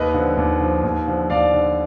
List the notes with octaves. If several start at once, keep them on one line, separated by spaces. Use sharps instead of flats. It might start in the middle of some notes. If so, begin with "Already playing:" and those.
Already playing: D#2 B4 D#5
D3 F3
D#2
D3 F3
D#2
D3 F3
D#2 D5 F5
D3 F3